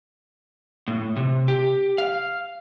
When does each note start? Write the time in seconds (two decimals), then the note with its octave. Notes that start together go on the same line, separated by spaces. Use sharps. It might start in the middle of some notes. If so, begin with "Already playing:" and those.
0.88 A2
1.16 C3
1.48 G4
1.98 F5